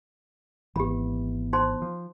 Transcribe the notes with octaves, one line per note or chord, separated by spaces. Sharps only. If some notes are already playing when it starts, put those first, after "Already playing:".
G#1 E3 B3 G4 B5
D#4 C5 C6
F3